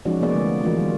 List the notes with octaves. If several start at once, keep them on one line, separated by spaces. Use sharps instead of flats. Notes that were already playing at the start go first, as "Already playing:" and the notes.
F3 G#3 C#4 D#4 F#4 D5
C3 F3 A#3 B3 G#4 D5
D3 G#3 A3
E3 G#3 F4 F#4 A#4
G3